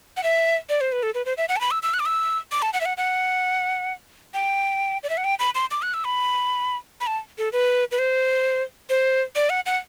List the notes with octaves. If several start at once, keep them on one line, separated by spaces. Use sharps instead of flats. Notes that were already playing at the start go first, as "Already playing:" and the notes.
F#5
E5
D5
C5
B4
A4
B4
C5
E5
F#5
A5
B5
E6
E6
F#6
D6
E6
D6
A5
F#5
E5
F#5
F#5
G5
D5
E5
F#5
G5
B5
C6
D6
F#6
E6
B5
B5
A5
A4
B4
B4
C5
C5
D5
F#5
F#5